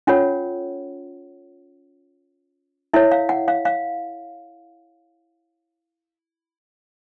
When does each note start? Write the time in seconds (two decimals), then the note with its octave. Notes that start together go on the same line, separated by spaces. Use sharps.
0.07 C#4 F4 A4 C#5 F#5
2.93 E4 A4 C#5 E5
3.12 F5
3.29 F#5
3.48 F5
3.65 F5